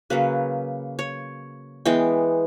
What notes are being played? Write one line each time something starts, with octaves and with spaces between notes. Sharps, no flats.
C#3 F#3 A#3 B4
C#5
E3 G#3 B3 G5